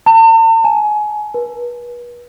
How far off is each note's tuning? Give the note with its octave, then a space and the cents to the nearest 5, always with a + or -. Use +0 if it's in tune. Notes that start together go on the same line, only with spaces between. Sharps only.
A5 +45
G#5 +25
B4 -40